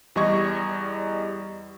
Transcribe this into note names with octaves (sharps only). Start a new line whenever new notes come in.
E2 G3 D#5 C#6 G#6 A#6